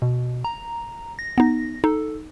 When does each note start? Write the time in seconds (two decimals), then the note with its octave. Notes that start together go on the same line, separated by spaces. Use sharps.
0.02 B2
0.44 A#5
1.19 A#6
1.38 B3 D#4
1.84 D#4 A4